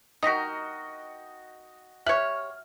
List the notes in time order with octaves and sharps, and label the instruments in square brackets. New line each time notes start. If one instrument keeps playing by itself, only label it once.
[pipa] D#4 A#4 [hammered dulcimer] F#4 G5 [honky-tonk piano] D#5 [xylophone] D#6 A#6 B6
[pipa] G4 C#5 [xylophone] E5 F#6 F#7 [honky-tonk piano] F6